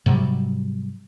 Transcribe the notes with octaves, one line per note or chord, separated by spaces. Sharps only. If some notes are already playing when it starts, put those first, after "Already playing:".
G#2 C3 F#3 G3